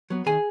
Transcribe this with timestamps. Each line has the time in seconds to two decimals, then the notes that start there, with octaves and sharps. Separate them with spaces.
0.10 F#3 B3
0.26 D#3 G#4 G#5